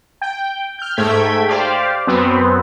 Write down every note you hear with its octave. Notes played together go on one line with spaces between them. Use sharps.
G5
F6 G6
G#2 A3 G5 G#6 B6
G4 C5 D5 F5
F#2 B3 C4